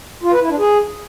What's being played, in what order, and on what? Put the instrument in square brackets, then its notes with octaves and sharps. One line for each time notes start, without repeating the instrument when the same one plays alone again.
[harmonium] F4
B4
E4
D4
G#4